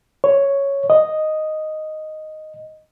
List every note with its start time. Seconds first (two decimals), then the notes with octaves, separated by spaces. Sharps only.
0.24 C#5
0.90 D#5